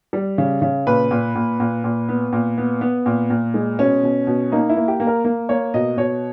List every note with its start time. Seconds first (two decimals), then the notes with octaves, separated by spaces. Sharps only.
0.13 G3
0.38 C#3
0.62 C#3
0.87 A#2 B4
1.11 A#2
1.35 A#2
1.60 A#2
1.84 A#2
2.09 B3
2.32 A#2
2.58 B3
2.81 B3
3.06 A#2
3.30 A#2
3.54 G#3
3.79 B2 C#4
4.03 B2
4.27 B2
4.52 A#3 D#4
4.70 E4
4.77 A#3
4.88 G4
5.00 A#3
5.07 A#4
5.25 A#3
5.49 A#3 C#5
5.74 B2 D#5
5.97 B2 C#5